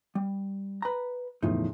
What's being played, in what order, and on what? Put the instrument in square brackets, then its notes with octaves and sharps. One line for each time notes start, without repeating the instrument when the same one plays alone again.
[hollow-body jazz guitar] G3
B4 A#5
[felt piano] E2 A2 [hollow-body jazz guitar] C#3 F3 D#4